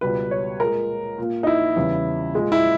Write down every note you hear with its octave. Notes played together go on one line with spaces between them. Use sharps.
C#2 B2 G3 B4
C#5
A#2 G#3 A#4
A#2 A#3
D#4
E4
E2 C#3 G3
A#2 G#3
E4